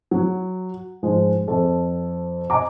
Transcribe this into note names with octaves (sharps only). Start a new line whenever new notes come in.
F#3
G#2 F3 G#3
F2 A4
D#5 G#5 A#5 D6